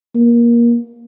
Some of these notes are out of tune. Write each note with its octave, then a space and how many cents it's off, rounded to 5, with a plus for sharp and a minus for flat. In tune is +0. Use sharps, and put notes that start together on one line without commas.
A#3 +20